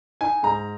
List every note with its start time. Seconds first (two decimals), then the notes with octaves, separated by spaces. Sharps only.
0.21 D#4 G#5
0.43 G#2 A#5